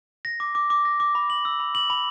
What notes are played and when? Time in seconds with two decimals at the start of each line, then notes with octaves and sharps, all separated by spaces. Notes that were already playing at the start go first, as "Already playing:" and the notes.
0.25 A#6
0.40 D6
0.55 D6
0.70 D6
0.85 A#6
1.00 D6
1.15 B5
1.30 F#7
1.45 E6
1.60 B5
1.75 F#7
1.90 B5